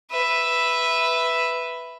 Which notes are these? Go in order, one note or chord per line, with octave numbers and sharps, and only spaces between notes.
B4 E5